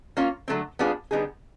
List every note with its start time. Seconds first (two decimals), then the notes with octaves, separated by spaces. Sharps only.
0.17 A#3 C#4 F4
0.48 D3 F#3 A3 C4
0.79 G3 B3 D4 F4 G#4
1.11 D3 G3 B3 D#4 G#4